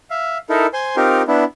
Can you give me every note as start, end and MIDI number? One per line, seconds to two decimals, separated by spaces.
0.10 0.38 76
0.10 0.38 77
0.50 0.66 63
0.50 0.66 64
0.50 0.66 69
0.50 0.66 70
0.73 0.96 72
0.73 0.96 80
0.73 0.96 84
0.97 1.22 60
0.97 1.22 63
0.97 1.22 65
0.97 1.22 67
0.97 1.22 70
1.28 1.44 59
1.28 1.44 62
1.28 1.44 64